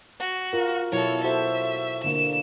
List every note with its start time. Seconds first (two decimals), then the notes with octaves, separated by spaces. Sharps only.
0.20 F#4
0.53 F4 A#4
0.92 B2 F#3 E4 A4 C#5
1.24 F#4 A4 C5 E5
2.04 D3 A#3 E7